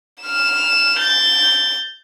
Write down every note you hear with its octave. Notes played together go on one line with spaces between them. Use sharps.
F6 E7
G6 A6